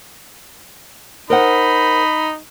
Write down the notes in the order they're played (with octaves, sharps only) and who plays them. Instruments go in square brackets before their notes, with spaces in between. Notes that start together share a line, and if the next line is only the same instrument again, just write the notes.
[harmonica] D#4 [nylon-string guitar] A#4 C5 F#5 [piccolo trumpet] B5